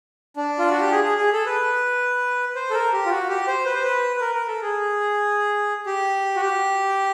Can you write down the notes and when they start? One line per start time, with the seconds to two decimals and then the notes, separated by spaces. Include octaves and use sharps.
0.36 D4
0.59 F4
0.70 F#4
0.81 G4
0.91 G#4
1.04 G#4
1.18 G#4
1.33 A4
1.46 B4
2.55 C5
2.70 A4
2.74 A#4
2.93 G4
3.05 F4
3.11 F#4
3.29 G4
3.47 C5
3.66 B4
3.75 C5
3.84 B4
4.16 B4
4.21 A#4
4.35 A#4
4.48 A4
4.62 G#4
5.86 G4
6.36 F#4
6.41 G4